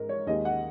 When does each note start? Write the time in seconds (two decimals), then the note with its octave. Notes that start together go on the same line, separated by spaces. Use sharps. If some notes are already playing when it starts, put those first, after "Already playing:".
Already playing: G#2 A#4
0.09 C#5
0.27 D#2 D#3 G#3 D#5
0.45 F#5